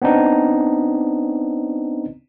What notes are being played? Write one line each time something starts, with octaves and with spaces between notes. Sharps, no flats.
B3 C4 D4 D#4